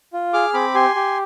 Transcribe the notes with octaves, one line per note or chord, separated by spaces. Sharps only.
F4
G#4 D6 F6
C4 B5 D6
G4 G#5 C6
G4